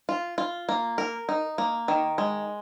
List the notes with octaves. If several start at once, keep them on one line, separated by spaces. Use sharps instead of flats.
F4
F4
A#3
A#4
D#4
A#3
D#3
G#3